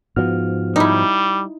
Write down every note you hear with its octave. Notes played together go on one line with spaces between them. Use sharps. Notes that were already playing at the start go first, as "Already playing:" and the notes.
G#2 F3 B3 F#4 F6
G3 D#4 E4